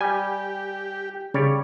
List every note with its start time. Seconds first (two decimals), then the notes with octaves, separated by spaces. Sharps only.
0.01 G3 G4 G#5
1.34 C#3 G3 C#5 D5